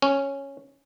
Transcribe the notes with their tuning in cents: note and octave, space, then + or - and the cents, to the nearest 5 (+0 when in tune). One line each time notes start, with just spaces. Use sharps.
C#4 -5